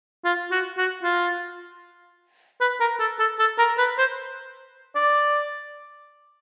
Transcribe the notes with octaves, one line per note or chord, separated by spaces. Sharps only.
F4
F#4
F#4
F4
B4
A#4
A4
A4
A4
A#4
B4
C5
D5